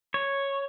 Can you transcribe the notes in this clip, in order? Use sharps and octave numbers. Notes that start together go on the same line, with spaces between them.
C#5